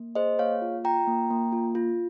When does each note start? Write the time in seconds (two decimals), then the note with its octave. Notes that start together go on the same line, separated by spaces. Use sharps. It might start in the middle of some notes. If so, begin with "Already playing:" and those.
Already playing: A#3
0.15 G#4 C5 D#5
0.39 A#3 C#5 F5
0.62 F4
0.84 F4 G5 A#5
1.07 A#3
1.31 A#3
1.52 F4
1.75 F4